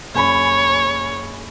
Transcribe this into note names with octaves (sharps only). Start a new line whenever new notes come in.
F#1 C#5 G#5 B5